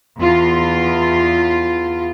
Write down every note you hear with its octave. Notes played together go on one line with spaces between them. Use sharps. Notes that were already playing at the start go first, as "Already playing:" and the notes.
E2 F4